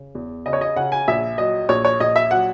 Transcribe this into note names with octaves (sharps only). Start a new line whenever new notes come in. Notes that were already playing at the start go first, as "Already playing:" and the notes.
Already playing: C#3
E2
C#3 D#5
C#5
D#5
C#3 F#5
G#5
A#1 E5
F#3 D#5
A#1 C#5
C#5
A#1 D#5
E5
F#3 F#5